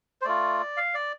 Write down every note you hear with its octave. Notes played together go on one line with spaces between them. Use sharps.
C5
A3 F4 D5
F5
D5